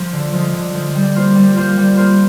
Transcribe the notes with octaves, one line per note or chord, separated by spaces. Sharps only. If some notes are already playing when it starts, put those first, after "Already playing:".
Already playing: F3
D3
F3 G#3
D3
F3 G#3
G3
A#3 F4 C5
G3
A#3 F4 C5
G3
A#3 F4 C5